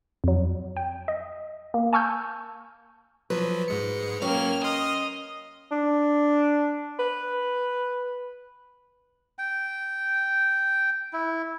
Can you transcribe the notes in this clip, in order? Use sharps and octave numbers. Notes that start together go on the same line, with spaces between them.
F2 F#3
G5
D#5
A#3
G#5 A5 C#6 E6 F6 G6
F3 F#3 B4
G#2 G#3 C#7
F#3 A#3 C#4 G5 F6
D#5 C6 F6
D4
B4
G5
E4